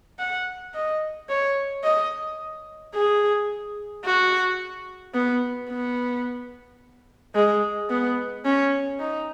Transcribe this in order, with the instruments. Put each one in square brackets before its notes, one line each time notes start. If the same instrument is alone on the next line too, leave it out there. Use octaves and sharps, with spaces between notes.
[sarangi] F#5
D#5
C#5
D#5
G#4
F#4
B3
B3
G#3
B3
C#4
D#4